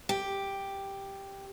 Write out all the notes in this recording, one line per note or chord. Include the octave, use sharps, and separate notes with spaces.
G4